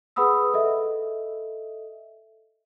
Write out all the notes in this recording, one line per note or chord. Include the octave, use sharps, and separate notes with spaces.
G#4 B4 F#5 B5 D#6 E6
A4 D#5 E5